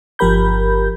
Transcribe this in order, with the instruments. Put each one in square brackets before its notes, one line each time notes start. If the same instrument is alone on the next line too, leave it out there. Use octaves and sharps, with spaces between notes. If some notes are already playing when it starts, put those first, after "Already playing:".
[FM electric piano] G1 F3 G4 A#4 B5 G6